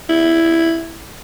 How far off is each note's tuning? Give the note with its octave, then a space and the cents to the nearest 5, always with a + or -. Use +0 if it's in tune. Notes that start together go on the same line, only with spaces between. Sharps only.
E4 +5